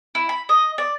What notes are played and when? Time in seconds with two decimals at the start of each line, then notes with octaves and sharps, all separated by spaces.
0.15 E4
0.29 B5
0.49 D#5
0.78 D5